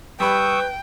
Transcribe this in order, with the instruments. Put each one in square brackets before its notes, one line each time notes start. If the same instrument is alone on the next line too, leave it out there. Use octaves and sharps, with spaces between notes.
[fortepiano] G2 G3 B5 [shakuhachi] B4 [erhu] G5 [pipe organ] C#6 D#6 E6